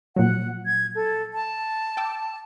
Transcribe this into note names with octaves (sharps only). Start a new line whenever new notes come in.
A#2 F3 F#3 F#5
G#6
A4
A5
G5 D6 E6